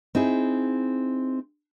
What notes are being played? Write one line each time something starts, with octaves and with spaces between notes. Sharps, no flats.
C4 D#4 E4 G#4